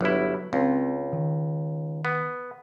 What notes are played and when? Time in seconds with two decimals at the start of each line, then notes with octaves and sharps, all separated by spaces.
0.01 G1 F#3 E4 B4 C#5
0.53 C#2 C4
1.13 D#3
2.05 B3